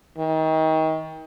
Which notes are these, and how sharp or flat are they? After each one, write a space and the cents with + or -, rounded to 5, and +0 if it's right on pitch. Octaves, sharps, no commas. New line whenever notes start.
D#3 +30